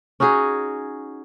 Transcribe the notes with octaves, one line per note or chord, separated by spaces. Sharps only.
C#4 D#4 F#4 G#4